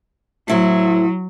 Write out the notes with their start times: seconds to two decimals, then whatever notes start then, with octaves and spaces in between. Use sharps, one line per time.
0.48 A2 F#3 E4 C5